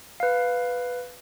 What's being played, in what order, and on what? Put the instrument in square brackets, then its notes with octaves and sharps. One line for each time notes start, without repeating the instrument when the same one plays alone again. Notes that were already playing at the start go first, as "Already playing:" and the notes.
[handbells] B4 F5